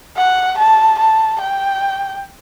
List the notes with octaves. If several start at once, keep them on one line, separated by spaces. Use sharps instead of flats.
F#5
A5
A5
G5